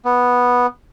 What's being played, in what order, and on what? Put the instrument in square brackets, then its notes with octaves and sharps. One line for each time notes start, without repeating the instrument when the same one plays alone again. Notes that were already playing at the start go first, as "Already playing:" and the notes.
[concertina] B3